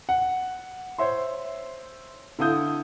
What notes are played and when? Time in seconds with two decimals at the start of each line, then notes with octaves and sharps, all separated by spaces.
0.09 F#5
0.98 C5 C#5 E5 C6
2.39 D3 E4 A4 F5 D#6 G6